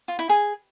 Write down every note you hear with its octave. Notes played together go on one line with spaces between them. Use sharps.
F4
E4
G#4